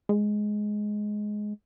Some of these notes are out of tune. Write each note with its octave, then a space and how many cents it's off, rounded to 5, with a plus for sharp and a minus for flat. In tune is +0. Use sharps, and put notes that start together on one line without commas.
G#3 +10